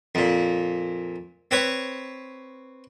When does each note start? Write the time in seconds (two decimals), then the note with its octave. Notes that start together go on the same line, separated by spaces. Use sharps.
0.15 F2 A#2
1.51 C4 B4 C#5